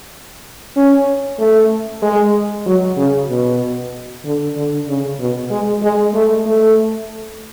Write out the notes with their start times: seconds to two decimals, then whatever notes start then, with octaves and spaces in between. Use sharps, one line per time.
0.76 C#4
1.38 A3
2.02 G#3
2.66 F#3
2.97 C#3
3.29 B2
4.24 D3
4.56 D3
4.88 C#3
5.19 B2
5.51 G#3
5.83 G#3
6.14 A3
6.45 A3